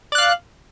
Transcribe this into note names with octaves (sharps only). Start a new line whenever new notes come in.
D5 F5 F#6